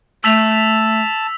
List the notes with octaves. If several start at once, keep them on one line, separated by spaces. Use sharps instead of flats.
A3 A5 E6 B6 F7